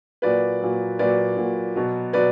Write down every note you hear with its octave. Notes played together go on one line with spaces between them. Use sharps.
A#2 F#3 B4 D5
A#2 F#3
A#2 F#3 B4 D5
A#2 F#3
B2 F#3
B2 F#3 B4 D5